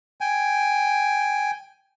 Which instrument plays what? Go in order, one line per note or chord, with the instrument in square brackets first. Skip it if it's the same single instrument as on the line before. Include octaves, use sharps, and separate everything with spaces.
[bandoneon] G5 G#5